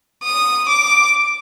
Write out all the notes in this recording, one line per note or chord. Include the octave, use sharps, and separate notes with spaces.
D#6
D6